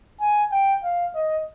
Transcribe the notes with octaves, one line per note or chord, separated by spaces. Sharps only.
G#5
G5
F5
D#5